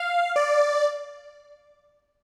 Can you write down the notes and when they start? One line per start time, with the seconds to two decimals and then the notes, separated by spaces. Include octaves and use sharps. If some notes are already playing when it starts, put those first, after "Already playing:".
Already playing: F5
0.36 D5